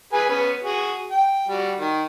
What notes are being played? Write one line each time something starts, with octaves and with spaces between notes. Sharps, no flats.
G#4 B4 G#5
B3 C#4 B4
F#4 G#4
G5
G3 F#4
D#3